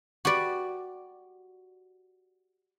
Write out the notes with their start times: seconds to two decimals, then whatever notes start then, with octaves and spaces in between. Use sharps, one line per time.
0.25 F#4 G4 B4 D5